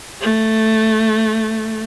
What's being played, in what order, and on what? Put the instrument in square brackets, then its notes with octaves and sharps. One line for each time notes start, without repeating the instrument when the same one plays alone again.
[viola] A3